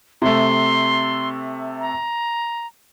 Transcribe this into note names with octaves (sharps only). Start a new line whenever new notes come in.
C3 A3 C6
A#5